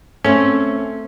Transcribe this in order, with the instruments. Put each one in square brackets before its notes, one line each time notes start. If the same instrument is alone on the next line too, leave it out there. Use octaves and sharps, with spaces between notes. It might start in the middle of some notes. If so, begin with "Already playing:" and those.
[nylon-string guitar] A3 C4 [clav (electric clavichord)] C#4